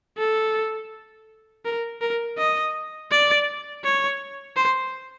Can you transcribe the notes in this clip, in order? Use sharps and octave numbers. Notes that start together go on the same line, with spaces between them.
A4
A#4
A#4
D#5
D5
C#5
C5